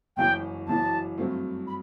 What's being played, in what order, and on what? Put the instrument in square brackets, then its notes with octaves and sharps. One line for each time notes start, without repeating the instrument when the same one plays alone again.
[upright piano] F#1 F#2 E3 [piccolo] G5
[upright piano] F#1 F#2 E3 [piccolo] A5
[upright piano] G2 F#3 A3 C4
[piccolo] B5